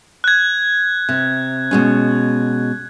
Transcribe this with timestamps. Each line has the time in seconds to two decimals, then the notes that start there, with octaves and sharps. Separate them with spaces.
0.24 F#6 G#6
1.09 C3
1.71 B2 G#3 C#4